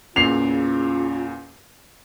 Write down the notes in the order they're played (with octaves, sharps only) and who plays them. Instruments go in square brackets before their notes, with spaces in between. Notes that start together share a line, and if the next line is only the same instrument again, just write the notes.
[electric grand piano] E2 A#2 [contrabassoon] C#3 [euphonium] F4 [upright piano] C7 F7